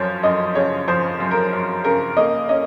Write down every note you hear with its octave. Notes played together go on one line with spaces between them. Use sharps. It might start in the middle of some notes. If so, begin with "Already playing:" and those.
Already playing: F#2 F3 C5 C#5
F#2 D#5
C#3 C#5
F3 C5
F#2
A#4
F#2
C#3 A#4
A#3 D#5
C#4 D#5